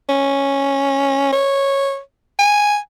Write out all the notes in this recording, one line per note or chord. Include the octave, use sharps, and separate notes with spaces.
C#4
C#5
G#5